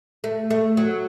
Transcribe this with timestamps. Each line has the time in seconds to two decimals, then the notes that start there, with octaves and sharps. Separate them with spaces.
0.24 A3
0.50 A3
0.77 F#3